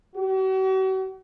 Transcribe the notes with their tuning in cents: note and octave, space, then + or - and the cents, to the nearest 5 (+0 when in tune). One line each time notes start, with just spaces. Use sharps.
F#4 +45